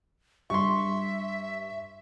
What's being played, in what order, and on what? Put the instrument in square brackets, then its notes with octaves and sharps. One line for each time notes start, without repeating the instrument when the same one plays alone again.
[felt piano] G2 [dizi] E5 [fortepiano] C6 C#6